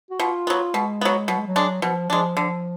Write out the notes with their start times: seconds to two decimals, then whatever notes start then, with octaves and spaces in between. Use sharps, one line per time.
0.10 F#4
0.19 B2 F4
0.47 F#3 B3
0.74 B2 G#3
1.01 F#3 B3
1.28 B2 F#3
1.38 G#3
1.47 F#3
1.56 G#3 D4
1.82 B2 F3
2.10 F3 G#3 D4
2.37 D3 F3